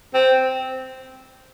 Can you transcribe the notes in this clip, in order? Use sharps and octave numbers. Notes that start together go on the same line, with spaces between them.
C4